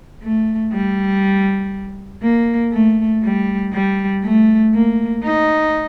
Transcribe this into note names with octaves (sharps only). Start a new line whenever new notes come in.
A3
G3
A#3
A3
G3
G3
A3
A#3
D#4